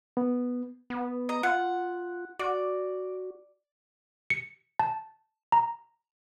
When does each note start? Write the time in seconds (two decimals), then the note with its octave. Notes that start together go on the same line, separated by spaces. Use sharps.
0.17 B3
0.90 B3
1.29 D#5 A#5
1.43 F4 F#5
2.39 F#4 D5
4.30 C#7
4.79 A5
5.52 A#5